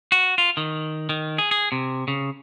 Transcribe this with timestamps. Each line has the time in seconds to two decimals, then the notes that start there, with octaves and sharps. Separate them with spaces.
0.12 F#4
0.38 F4
0.57 D#3
1.09 D#3
1.38 G#4
1.51 G#4
1.72 C3
2.08 C#3